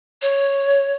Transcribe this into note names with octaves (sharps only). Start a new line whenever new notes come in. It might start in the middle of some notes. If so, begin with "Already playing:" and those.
C#5